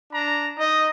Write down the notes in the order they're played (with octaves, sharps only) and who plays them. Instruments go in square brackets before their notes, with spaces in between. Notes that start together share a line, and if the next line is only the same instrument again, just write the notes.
[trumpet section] D4 A#5
D#4 D#5